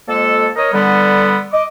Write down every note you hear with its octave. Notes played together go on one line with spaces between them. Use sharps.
F2 G#3 A#3 A4
A#4 C#5 D#5
D3 G3 B3
D#5 D6